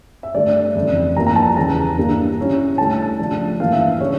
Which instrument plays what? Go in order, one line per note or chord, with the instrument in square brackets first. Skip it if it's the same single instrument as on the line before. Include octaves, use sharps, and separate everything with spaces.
[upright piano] E5
G2 D3 A3 D4 D5
F2 C#3 E3
G2 F3 A#3 E4 A#5
A#5
A5
E2 C#3 E3 A#5
G2 D3 G3 A#3 E4
D3 G3 C#4 E4
D3 A3 E4 A5
C#3 F3 A3 D4
G2 E3 A#3 E4 F5
E5
C#3 G3 D4 C#5